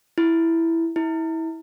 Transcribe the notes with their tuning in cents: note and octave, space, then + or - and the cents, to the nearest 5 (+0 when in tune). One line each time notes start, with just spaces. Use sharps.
E4 +0
E4 -25